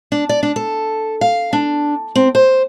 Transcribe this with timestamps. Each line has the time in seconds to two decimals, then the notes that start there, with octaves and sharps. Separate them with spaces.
0.12 D4
0.29 D5
0.43 D4
0.56 A4
1.21 F5
1.53 D4
2.15 C4
2.35 C5